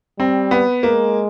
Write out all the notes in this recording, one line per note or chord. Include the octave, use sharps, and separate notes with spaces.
G3 C4
B3
G#3 A#3